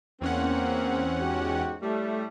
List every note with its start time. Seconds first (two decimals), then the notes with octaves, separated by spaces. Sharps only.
0.21 E2 A#3 C4 C#4 F#5
1.20 G#2 F#4 G4
1.82 A2 G3 A3